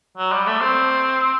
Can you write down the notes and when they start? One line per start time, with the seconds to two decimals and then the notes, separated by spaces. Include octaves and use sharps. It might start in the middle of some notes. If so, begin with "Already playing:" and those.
0.18 F#3
0.33 G3
0.47 A3
0.61 C4